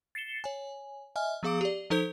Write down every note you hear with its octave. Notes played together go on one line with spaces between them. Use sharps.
A6 C7 C#7 E7 G7
C#5 G#5
D#5 E5 G#5 F6
F3 B3 G#4 F5 D6 D7
G4 D5
F3 D#4 A4 C5 G6